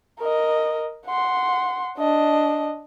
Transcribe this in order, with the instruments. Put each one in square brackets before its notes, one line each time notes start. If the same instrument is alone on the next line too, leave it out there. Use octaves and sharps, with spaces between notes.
[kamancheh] A#4 D#5
F#5 C6
D4 D#5